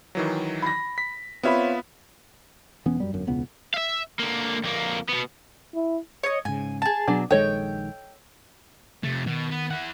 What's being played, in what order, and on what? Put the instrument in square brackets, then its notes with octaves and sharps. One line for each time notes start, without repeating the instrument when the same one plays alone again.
[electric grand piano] D#3 E3 F#3
[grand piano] B5 A#6
[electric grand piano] B6
[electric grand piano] B3 E5 B5 [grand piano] C4 F4 C#5
[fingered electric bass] E1 E3 B3 C#4
F#2 G3
G1 F#2
E1 C#2 B3
[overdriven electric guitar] E5 F5
D3 A#3
F2 A#3
B2 B3
[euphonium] E4
[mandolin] C#5 D#5
[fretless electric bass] G#2 C#3 [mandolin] G#5
[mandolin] G#4 A5
[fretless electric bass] B2 [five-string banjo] F#3 D4
[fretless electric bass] A#1 D#3 G#3 [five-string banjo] A4 C#5 D#5 [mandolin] G5
[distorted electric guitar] F2 A3 [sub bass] C3
[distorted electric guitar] B2 [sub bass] D#3
[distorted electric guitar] B3
E4 F#5